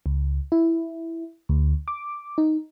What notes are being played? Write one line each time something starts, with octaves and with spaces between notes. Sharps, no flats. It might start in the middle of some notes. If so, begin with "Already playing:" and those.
C#2
E4
D2
D6
D#4